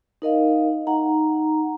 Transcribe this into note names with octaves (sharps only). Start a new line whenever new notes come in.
D#4 A#4 D#5 F5
D#4 F#5 A#5